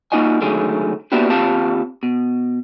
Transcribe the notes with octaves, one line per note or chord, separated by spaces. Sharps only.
A#3 D#4 F4 F#4 D#5 G#5
C#2 D3 D#3 F#3 A3 G#4
A#3 B3 D4 E4 F#4 G4
D#2 C4 F4 G4 F5 A5
B2